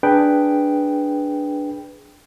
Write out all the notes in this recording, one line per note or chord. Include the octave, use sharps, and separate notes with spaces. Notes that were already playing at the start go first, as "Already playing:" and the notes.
D4 G#4 B4 G5